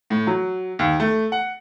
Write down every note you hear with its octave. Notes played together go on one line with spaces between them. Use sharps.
A2
F#3
D#2
A3
F#5